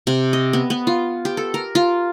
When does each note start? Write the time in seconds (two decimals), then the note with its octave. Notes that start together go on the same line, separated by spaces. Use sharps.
0.07 C3
0.33 D#5
0.53 B3
0.70 B3
0.87 F4
1.25 G4
1.37 A4
1.54 A#4
1.75 F4